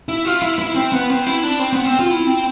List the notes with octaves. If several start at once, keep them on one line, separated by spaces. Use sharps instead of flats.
E4
F4
E4
E4
C4
B3
C4
E4
D4
C4
B3
C4
F4
E4
C4